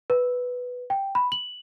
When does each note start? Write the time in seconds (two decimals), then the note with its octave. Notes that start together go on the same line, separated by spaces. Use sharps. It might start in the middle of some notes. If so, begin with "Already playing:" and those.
0.10 B4
0.90 G5
1.15 B5
1.32 F#7